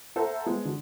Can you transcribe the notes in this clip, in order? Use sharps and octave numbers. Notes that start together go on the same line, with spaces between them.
A4 C5 E5 F#5 A5 A#5
G#3 B3
D3 F#4